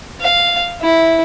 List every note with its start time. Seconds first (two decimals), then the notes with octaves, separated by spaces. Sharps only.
0.21 F5
0.81 E4